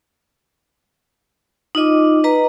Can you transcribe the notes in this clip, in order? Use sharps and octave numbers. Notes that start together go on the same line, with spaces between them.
D#4 F4 D#5 D6
B4 D#5 A#5